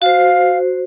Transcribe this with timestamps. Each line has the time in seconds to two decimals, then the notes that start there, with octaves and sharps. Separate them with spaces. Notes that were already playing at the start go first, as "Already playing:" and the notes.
0.02 F#4 C5 F5